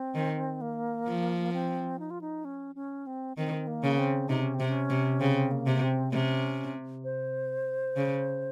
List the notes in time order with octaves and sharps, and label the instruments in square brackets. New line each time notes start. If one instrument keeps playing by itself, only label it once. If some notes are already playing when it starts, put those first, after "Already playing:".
Already playing: [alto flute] C4
[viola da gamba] D#3
[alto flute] A#3
[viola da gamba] F3
[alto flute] C4
D#4
F4
D#4
C#4
C#4
C4
[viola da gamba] D#3 [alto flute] C4
[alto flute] A#3
[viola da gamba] C#3
[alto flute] C4
[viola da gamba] C3 [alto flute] D#4
[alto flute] C#4
C4
[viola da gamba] C3
[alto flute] C#4
[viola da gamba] C3
[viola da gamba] C#3 [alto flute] C4
[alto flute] A#3
[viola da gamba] C3
[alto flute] C4
[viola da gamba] C3 [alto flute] C#4
[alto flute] C5
[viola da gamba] C#3